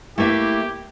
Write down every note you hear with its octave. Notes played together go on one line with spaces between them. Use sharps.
A3 A#3 E4 G4 E5